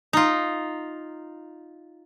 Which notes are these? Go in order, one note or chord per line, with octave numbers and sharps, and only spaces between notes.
D#4 F4